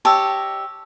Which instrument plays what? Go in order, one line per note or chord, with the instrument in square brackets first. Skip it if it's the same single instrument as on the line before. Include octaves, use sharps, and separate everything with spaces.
[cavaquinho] G4 C#5 D#5 [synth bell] A5 E6